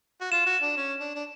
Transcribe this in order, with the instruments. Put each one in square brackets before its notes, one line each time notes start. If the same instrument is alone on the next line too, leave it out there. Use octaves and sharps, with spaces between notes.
[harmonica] F#4
[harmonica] F4 [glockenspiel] E7
[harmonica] F#4
D4
C#4
D4
D4